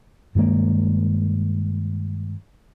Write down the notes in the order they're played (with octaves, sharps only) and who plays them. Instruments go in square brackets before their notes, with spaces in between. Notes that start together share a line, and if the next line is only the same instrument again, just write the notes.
[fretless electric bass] G2 D#3 G#3 A#3